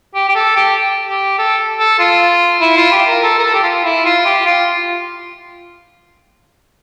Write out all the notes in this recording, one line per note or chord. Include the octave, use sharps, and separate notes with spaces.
G4
G4
A4
G4
G4
A4
A4
F4
E4
F4
G4
A#4
A4
A#4
A4
G4
F4
E4
F4
G4
F4